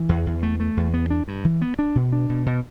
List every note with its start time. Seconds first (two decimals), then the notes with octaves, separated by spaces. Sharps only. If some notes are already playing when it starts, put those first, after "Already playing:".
Already playing: E3
0.09 E2
0.26 E2
0.43 A3
0.60 A3
0.77 E2
0.94 B3
1.10 D4
1.28 G2
1.45 E3
1.62 B3
1.79 D4
1.95 B2
2.12 D4
2.29 B2
2.46 B2